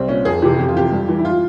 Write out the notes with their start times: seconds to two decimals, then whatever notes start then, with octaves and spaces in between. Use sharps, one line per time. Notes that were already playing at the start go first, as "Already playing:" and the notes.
Already playing: C2 C4
0.08 A#2 C#4
0.25 F2 G#4
0.42 C3 E3 G4
0.58 F2 G4
0.68 F4
0.75 C3 E3 G4
0.92 G2
1.08 E3
1.19 E4
1.25 F4